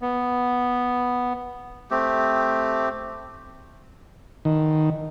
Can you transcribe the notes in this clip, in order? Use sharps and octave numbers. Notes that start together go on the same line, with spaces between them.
B3
A3 C4 G4
D#3